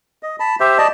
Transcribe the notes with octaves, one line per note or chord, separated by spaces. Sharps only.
D#5
A5 B5
G4 C5 E5
D5 D#5 A5